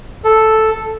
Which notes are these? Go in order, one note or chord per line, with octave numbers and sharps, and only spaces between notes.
A4